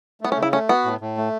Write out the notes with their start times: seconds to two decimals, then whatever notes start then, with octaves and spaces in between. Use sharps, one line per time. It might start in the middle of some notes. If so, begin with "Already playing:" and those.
0.21 A3 B3
0.32 C#4
0.37 C#3
0.43 E4
0.53 A3 C#4
0.69 B3 F#4
0.85 A2
1.01 A2
1.17 A3